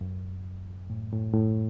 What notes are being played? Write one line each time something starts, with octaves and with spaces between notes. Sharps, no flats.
F#2
A2
A2
A2